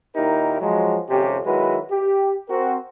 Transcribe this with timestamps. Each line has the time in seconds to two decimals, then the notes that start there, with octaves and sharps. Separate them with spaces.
0.16 D#2 A#2 D#4 E4 G4 A#4
0.61 F3 F#3 G#3
1.10 G#1 F2 C3 C#4 G4
1.45 D#3 F#3 G#3 E4 F#4 B4
1.91 G4
2.49 C4 F#4 A#4